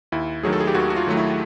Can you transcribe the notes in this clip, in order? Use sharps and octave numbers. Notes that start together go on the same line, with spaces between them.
D#2 E4
D#3 F#3 A3 G#4
A4
G#4
G4
D#2 F#4
F#4
F4
D#3 F#3 A3
E4